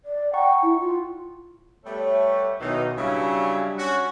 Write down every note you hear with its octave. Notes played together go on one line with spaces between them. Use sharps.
D5
F#5 G5 A#5 C#6
E4
F4
G3 A3 B3 C#5
B1 B2 D#3 E3 D#4
C#3 F#3 G3 D4 E4
C#4 F#4